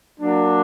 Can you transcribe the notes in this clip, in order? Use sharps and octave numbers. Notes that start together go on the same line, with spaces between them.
F#3 A#3 D4